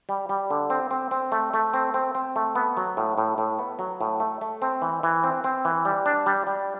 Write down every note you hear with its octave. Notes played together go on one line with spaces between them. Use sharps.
G3
G3
D3
C4
C4
C4
A3
A3
C4
C4
C4
A3
B3
F#3
A2
A2
A2
B3
F#3
A2
A3
A3
C4
E3
E3
C4
C4
E3
G3
D4
G3
G3